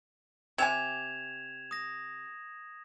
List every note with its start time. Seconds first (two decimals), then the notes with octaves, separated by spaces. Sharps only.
0.58 C3 G4 G#5 G#6 E7 F7
1.71 D#6 A#6